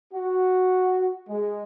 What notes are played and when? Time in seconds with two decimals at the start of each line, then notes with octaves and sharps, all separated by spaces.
0.13 F#4
1.29 G#3